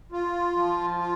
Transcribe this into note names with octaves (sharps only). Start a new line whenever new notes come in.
F4
F3
F4